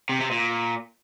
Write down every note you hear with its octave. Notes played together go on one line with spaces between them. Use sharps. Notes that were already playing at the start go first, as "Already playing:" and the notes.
C3
C3
A#2